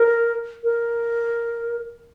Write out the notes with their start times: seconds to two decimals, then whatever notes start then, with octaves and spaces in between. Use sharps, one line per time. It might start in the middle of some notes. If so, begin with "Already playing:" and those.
Already playing: A#4
0.64 A#4